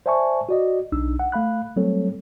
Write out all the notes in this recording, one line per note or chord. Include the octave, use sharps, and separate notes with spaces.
C5 D5 E5 G#5 A5 C#6
F#4 D5 D#5
B1 D4 D#4 E6
F#5
A3 F5 B5 F#6
F#3 G3 A3 C4 A4 C#5